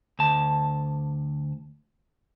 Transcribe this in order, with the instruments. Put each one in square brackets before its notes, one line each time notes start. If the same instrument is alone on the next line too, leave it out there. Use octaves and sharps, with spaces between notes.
[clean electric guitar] D2 A5